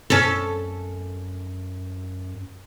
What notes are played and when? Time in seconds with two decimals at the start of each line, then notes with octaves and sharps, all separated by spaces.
0.10 F#2 C#4 A4